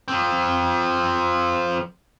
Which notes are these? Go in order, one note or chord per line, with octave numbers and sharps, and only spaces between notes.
F3 C4